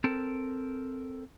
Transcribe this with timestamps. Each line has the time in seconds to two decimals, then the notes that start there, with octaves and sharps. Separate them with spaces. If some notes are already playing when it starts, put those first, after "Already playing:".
0.04 C4 A4 A#4